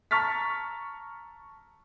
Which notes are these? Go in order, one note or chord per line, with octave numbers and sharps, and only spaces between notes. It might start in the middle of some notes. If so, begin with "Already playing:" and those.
A5 A#5 C#6 F6 A6 B6